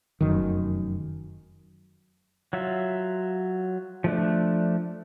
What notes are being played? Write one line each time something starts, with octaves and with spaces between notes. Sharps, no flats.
F1 F#2 D#3
F#3 F4 E5
F3 A3 D4